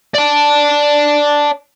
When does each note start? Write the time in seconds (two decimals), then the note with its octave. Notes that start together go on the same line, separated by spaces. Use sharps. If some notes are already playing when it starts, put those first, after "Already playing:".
0.15 D5 A5